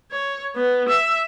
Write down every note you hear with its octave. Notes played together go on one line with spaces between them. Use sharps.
C#5
B3
E5